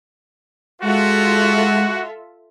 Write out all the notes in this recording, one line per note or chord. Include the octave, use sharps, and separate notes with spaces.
G#3 F4 F#4 A4 E5